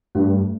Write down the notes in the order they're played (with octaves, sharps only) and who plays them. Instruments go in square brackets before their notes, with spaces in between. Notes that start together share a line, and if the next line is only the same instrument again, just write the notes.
[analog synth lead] G2 [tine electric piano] A3